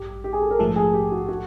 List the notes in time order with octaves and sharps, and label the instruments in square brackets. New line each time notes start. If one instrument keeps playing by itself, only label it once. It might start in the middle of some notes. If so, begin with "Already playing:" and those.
Already playing: [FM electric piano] A1 G2 [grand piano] G4
[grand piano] G4
G#4
A4
A#4
[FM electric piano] A#1 G#2 F3 A3 [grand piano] A4
[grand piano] G#4
G4
F#4
F#4